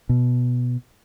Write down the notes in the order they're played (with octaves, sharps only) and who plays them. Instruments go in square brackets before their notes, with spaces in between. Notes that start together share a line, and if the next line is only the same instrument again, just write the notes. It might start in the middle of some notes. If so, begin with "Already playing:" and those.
[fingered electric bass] B2